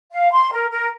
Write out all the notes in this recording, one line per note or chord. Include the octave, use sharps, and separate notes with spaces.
F5
C6
A#4
A#4